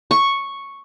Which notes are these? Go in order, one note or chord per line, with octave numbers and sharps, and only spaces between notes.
C#6